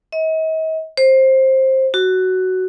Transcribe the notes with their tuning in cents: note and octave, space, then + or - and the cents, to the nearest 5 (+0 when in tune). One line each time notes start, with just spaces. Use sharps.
D#5 +40
C5 +15
F#4 +10